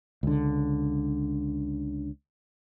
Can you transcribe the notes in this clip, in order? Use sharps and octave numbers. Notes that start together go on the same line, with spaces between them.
C#2 D3